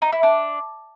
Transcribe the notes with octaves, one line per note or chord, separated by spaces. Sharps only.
D#4
E4
D4